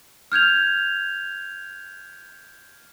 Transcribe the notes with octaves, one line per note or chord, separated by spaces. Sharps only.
F6 G6 G#6 F7